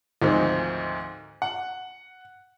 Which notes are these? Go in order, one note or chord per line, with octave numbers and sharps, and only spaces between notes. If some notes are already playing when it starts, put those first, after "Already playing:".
D2 G#2 D#3 F3 G#3 C4
F#5